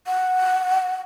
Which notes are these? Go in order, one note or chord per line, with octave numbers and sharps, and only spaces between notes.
F#5